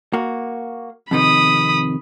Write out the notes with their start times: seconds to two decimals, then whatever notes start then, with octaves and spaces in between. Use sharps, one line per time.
0.13 A#3 F#4
1.11 F2 C3 D#3 B5 D#6